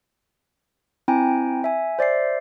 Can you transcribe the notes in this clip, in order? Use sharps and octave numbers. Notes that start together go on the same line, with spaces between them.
C4 E4 G5 G#5 A#5
E5 G#5
C5 D5 E5 C7